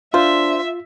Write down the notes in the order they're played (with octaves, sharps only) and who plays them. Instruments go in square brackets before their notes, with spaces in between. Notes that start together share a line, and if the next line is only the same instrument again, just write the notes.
[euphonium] D4 [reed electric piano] F4 [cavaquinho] C5 [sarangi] E5